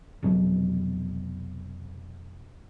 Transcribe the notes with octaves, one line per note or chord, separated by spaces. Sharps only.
F1 B2 F#3